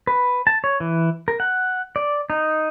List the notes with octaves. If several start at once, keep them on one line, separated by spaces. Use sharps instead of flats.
B4
A5
C#5
E3
A#4
F#5
D5
D#4